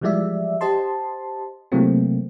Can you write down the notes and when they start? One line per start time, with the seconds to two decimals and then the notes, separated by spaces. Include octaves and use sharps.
0.01 E3 F3 G3 G#3 D5 E5
0.61 G4 C5 D#5 A5 C6
1.72 C3 E3 F#3 A3 A#3 C4